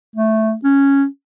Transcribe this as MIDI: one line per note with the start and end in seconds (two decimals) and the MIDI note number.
0.16 0.54 57
0.64 1.05 61